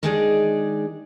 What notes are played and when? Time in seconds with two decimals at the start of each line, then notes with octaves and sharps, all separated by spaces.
0.03 D#3 G#3 D4 D#4 G#4 D5